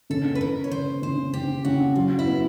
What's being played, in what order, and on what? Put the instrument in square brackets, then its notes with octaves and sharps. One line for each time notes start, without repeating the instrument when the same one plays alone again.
[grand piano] C#3 [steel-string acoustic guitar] A4
[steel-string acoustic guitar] B4
[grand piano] C#3 [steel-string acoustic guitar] A#4
[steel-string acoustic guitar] C#5
[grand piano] C#3 [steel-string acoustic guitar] C5
[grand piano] C#3 [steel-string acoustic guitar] C5
[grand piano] C#3 [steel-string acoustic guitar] G4
[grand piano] C#3 [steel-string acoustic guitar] F#4
[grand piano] F#3 [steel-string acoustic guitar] F4
[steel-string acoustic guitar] E4
[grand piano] B3